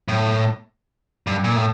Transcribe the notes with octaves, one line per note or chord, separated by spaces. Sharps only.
A2
G2
A#2
A2